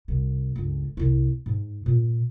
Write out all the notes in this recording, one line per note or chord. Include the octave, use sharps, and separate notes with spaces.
C2
G1 C#2
C2 E4
G#2
A#2